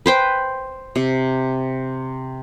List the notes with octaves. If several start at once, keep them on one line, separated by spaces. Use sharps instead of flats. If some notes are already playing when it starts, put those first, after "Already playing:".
B4 C5 G5
C3